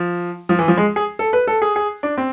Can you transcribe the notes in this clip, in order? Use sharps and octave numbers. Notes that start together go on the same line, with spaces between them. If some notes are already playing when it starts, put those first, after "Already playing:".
Already playing: F3
F3
E3
F3
G#3
G#4
A4
B4
A4
G#4
G#4
D4
C4